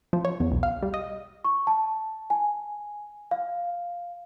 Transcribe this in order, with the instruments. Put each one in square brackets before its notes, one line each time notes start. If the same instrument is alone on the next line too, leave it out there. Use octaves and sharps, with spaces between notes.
[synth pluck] F3
C#5
E2
B1
F5
G3
D#5
[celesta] C#6
A5
G#5
F5